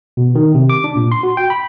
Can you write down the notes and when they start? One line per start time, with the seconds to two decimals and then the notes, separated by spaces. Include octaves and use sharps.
0.17 B2
0.35 D#3
0.55 C3
0.70 D6
0.84 D4
0.96 A#2
1.12 C6
1.23 F#4
1.37 G5
1.50 B5